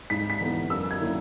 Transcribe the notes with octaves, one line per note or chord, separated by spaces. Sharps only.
G#2 B6
B6
E3 B3
F#2 E6
G#6
D#3 A#3 C#4 E4